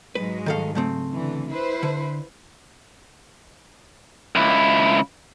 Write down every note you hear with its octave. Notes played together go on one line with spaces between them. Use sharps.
G#2 F#3 G#3 B4
D#3 A4 F5
C#3 A3 C4
D3 E3
E4 B4 C5
D3
C#2 E4